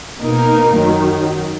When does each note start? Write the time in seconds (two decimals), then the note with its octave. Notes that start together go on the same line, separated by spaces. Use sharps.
0.20 B2 A#3 D#4 A#4
0.76 F#2 D#3 F#3